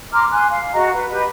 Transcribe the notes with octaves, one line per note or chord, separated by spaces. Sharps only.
A#5 C6 D6 F6
G#5 C6 F#6
F5
F#4 G#4 D#5 A#5
B4
G4 B4 D#5